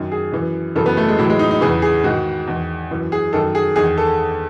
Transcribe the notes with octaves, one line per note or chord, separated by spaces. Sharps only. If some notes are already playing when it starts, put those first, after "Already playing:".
Already playing: F#2 D#3
G#4
F#2 E3
F#2 C#3 E3 A4
B3
A3
G#3
A2 E3 F#3
G#3
D#4
D#4
E2 C#3 E3 G#4
G#4
G#2 D#3 F#4
E2 D#3
F#2 E3
G#4
F#2 D#3 A4
G#4
E2 D#3 G#4
A4